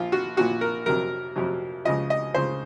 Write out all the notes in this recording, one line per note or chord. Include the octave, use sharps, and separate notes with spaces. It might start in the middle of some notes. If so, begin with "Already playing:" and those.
Already playing: A#1 A#2 F3 F4
F#4
A#1 A#2 F3 F#4
A#4
F2 C3 F#3 A#4
F2 C3 F#3
C#2 C#3 F3 D#5
D#5
C#2 C#3 F3 C5